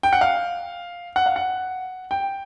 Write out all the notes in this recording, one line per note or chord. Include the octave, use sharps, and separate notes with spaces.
G5
F#5
F5
F#5
F5
F#5
G5